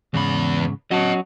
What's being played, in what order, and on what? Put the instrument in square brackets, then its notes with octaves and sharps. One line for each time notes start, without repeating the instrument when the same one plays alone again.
[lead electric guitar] E2 B5 [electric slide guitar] G#2 C#3
[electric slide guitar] F#3 C#4 F#4 [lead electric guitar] D#5 A5